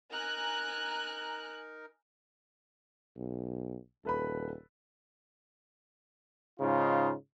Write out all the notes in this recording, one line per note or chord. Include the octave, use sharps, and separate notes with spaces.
D#4 A#4 G#5 A#5 F#6
B1
D#1 A4 B4 B5
G#2 C#3 D#4 F4